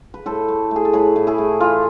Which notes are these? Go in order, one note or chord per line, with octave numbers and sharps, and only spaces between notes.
B4
A2 A4 C5
A3
A3 G#4
A4
A2 G#4 B4
A2
E4 G#4
A3
E3 F4